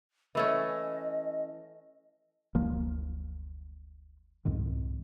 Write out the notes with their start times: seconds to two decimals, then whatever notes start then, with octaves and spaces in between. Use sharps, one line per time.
0.35 E3 A3 C#4 D#5
2.55 F#1 D2 F3 A#3
4.45 C2 F2 G#2 D#3